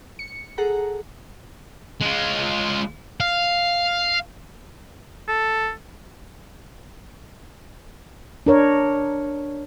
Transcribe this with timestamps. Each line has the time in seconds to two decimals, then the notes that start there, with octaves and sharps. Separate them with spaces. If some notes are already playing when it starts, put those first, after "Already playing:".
0.19 C#7
0.58 G#4 A4 F#5 A#5
2.01 G#3 F4
3.20 F5
5.28 A4
8.46 D4 A#4 C#5